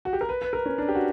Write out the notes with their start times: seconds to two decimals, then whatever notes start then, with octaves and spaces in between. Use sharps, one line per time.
0.05 F#4
0.13 G4
0.21 A#4
0.29 B4
0.42 B4
0.53 A#4
0.66 C#4
0.78 D4
0.88 G4
0.95 F#4